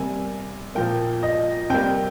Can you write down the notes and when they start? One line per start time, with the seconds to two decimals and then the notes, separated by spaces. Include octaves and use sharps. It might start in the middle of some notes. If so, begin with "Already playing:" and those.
Already playing: C3 G3 A#3 G#5
0.75 A#2 F3 A#3 G5
1.23 D#5
1.70 C3 G3 A#3 G5